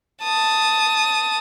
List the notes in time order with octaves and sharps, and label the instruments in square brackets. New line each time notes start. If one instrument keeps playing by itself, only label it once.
[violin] A5 D#6